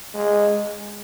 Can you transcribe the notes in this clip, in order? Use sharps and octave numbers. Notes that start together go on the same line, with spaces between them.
G#3